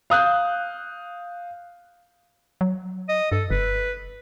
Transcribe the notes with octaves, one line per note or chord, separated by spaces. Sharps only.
F5 D#6 F#6 G6
F#3
D#5
G2 A4
F#1 B4